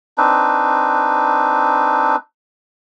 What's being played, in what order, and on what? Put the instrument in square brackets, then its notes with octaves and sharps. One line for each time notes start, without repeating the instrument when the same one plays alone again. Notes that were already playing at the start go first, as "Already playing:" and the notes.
[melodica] C4 D4 D#4 B4